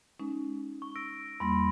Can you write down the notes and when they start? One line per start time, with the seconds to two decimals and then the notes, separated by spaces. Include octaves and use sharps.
0.20 G#3 C#4 D#4
0.82 C#6
0.96 E6 A#6 D7
1.40 E2 G3 A#3 B5 C6 A#6